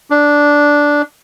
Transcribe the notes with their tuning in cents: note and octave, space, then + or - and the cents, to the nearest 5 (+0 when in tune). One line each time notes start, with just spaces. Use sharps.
D4 -5